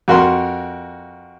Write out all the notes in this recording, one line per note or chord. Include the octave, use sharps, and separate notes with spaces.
F2 F#4 A#4 C6